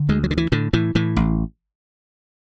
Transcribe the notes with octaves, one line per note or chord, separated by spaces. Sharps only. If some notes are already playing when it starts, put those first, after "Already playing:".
Already playing: D3
D2 G#3
F#3
D3
E3
A2 D3
A2 E3
A2 E3
A1